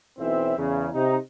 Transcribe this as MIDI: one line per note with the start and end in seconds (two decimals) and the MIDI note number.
0.18 0.56 35
0.18 0.56 52
0.18 0.56 60
0.18 0.56 76
0.57 0.88 40
0.57 0.88 49
0.93 1.16 48
0.93 1.16 63